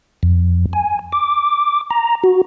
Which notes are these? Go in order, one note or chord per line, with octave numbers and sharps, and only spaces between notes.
F2
G#5
D6
A#5
F#4